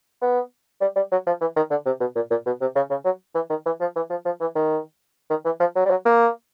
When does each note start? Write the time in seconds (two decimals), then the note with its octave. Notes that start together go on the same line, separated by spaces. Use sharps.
0.22 B3
0.81 G3
0.96 G3
1.12 F#3
1.27 F3
1.41 E3
1.56 D#3
1.71 D3
1.86 C3
2.00 B2
2.16 A#2
2.31 A#2
2.46 B2
2.61 C3
2.76 C#3
2.90 C#3
3.05 F#3
3.35 E3
3.50 D#3
3.66 E3
3.81 F3
3.96 E3
4.10 F3
4.26 F3
4.41 E3
4.55 D#3
5.30 D#3
5.45 E3
5.60 F3
5.76 F#3
5.86 G3
5.91 F#3
6.05 A#3